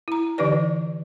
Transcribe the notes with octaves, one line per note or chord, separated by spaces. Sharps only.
E4 A#5
D3 E3 D#4 G4 B4 D5